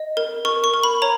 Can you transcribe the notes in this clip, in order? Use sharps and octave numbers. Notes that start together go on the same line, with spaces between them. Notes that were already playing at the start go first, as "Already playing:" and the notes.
Already playing: D#5
A#4
A#4 C#6
C#6
A#4
B5
C#5 A#5